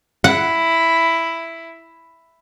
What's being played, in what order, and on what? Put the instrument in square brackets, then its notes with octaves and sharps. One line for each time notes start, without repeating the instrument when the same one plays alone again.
[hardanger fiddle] E4 [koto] F#5